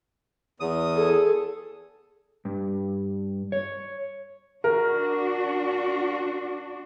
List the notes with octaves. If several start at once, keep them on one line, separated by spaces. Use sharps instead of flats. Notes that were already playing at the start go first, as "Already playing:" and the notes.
E2 D#6
G#4 A4
G2
C#5
D4 F#4 A#4